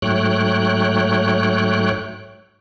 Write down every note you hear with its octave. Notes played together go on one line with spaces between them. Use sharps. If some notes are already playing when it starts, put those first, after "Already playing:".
G#2 F#3 A3 C#5 G5 F#6